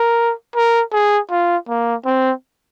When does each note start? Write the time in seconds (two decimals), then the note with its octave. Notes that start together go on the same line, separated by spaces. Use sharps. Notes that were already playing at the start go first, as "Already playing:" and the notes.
Already playing: A#4
0.56 A#4
0.93 G#4
1.31 F4
1.69 A#3
2.05 C4